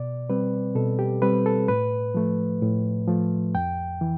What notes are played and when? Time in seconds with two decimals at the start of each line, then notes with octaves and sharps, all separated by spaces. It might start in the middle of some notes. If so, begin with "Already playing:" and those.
Already playing: B2 D5
0.30 G3 C4 B4
0.75 B2 A4
0.99 G4
1.22 G3 C4 B4
1.46 A4
1.68 A2 B4
2.15 F3 A3
2.62 A2
3.07 F3 A3
3.55 F2 G5
4.01 E3